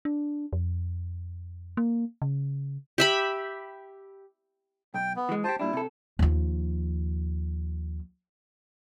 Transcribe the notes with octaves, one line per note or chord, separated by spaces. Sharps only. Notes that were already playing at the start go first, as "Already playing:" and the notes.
D4
F2
A#3
C#3
G4 E5 B5
B1 G5
B3
E3 G#3
F4 G4 C5 A5
A#2 G3 D4 E4
C3 A4
D#2 F3